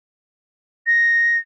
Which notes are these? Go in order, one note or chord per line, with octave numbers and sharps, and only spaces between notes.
A#6